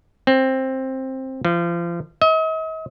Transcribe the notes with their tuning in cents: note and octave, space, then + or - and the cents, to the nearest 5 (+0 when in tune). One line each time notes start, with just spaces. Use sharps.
C4 +10
F3 -35
D#5 +45